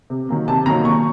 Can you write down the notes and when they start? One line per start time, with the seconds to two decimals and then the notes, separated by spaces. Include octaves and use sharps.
0.10 C3
0.29 D#3 F#3 A#3
0.48 C3 A5
0.66 D#3 F#3 A#3 A#5
0.85 A#2 C#6